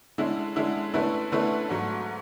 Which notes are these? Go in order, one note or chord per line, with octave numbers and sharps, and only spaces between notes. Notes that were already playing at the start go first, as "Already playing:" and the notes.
D3 G#3 C#4 E4
D3 G#3 C#4 E4
D3 A3 C#4 E4 B4
D3 A3 C#4 E4 B4
G#2 F#3 A3